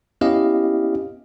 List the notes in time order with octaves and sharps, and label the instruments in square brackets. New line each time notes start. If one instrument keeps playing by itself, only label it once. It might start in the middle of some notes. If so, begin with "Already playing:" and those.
[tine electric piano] B3 C#4 E4 G4 D#5 F5